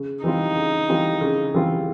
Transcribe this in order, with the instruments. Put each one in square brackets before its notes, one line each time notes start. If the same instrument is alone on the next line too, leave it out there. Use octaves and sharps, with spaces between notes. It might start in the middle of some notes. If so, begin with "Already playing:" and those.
Already playing: [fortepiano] C#3
[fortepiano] E3 G3 C4 F4 [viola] D#4
[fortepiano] C#3
E3 G3 C4 F4
C#3
E3 G3 C4 F4